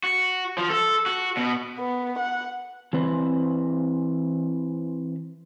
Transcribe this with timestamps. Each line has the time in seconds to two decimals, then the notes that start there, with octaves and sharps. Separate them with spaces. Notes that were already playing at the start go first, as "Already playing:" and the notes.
0.03 F#4
0.58 F3
0.70 A4
1.06 F#4
1.37 B2
1.79 B3
2.19 F#5
2.93 E3 C4 B4 C5